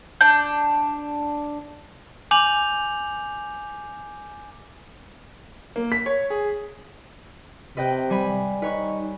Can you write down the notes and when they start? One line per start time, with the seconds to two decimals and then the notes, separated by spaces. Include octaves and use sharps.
0.21 D4 G6
2.31 G#5 D6 G6 F7 F#7
5.76 A#3
5.92 B6
6.06 C#5
6.30 G#4
7.77 C3 B4 D#5 G5
8.10 G3 G#5 B5
8.62 D#4 B4 C#5 C#6